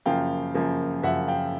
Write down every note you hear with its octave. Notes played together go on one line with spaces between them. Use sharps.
F#2 C#3 F3 A#3 F5 G5
F#2 C#3 F3 A#3
F#2 C#3 F3 A#3 E5 F#5
F5 G5